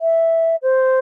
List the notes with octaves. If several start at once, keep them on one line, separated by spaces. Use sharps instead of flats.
E5
C5